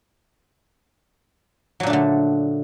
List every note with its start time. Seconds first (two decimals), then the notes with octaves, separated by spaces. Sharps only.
1.80 F#3
1.83 A#2
1.87 D4
1.90 A3
1.93 D3